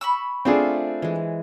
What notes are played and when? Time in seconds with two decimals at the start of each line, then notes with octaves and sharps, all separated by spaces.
0.01 B5 C#6 E6
0.45 A3 C4 D4 F4 G#4 C5
1.02 E3 G#3